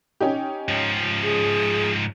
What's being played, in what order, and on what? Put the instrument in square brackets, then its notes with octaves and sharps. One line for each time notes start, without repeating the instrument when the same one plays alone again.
[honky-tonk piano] C#4 D#4 G4
[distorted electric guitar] G#2 F3
[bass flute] G#4